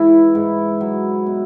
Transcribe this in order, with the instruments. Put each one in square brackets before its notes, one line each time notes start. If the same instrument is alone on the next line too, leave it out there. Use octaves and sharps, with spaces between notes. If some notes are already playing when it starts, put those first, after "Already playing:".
Already playing: [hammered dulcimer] G#2 E3 E4
G#2
F#3
B2